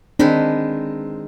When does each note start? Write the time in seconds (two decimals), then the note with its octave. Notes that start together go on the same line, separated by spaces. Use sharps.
0.19 D#3 G#3 C4 D4 B4